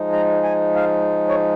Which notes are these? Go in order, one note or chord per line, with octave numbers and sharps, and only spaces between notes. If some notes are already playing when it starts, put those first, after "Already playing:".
Already playing: F3 G#3 D#4
A#5
G#5
F5
C#5